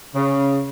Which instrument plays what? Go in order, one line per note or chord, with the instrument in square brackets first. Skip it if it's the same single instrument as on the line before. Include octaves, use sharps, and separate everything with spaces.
[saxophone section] C#3